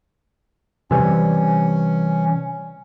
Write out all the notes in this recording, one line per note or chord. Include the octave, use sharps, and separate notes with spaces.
C3 E3 G3 C#4